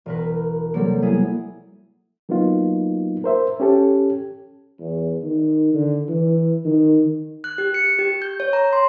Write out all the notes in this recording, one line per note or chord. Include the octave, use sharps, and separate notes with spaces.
E1 A#4 B4
C3 F#3 G3 A#3 A4
B3 E4 G#4
F#3 A#3 B3 D#4 F4
A#4 C5 E5
C#4 G4 A4
E2
D#3
D3
E3
D#3
F#6
G4
C#7
G4
G6
C#5
A#5
C6